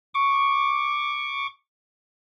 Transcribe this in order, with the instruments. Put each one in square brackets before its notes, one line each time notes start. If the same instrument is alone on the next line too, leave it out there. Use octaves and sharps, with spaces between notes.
[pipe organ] C#6 D6